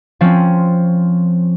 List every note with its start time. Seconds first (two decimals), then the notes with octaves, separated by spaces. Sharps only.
0.21 F3 C4 C#4